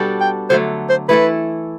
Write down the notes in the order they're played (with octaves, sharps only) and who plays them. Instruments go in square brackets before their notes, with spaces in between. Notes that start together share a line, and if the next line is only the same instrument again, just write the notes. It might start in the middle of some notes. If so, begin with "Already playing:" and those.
Already playing: [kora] B2 G3 B3 D4 F#4 A4
[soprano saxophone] G5
[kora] D3 F#3 A3 [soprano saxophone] C5
[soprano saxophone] C5
[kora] E3 A3 E4 A4 [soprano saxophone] B4